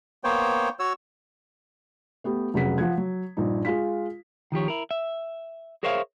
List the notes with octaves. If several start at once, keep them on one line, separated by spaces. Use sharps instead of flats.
A#3 B3 C5 C#5 G5
F#4 C#5 E6
A3 B3 G4
F1 C#3 F#3 G#4 F#5 B6
F3 F#5 G#6
F#3
A#1 G2 D#4
G#3 F4 F5 B6
D#3 F3 G4 C#5
E4 A#4
E5
G#4 A#4 C5 C#5 E5 F5